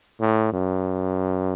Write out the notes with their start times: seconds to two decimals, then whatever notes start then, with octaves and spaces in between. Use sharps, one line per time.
0.20 A2
0.53 F#2